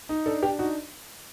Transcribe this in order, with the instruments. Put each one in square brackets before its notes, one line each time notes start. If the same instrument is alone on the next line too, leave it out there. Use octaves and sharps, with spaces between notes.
[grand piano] D#4
[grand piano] D4 [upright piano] A4
[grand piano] D4 [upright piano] G4
[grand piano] D#4 [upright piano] F#4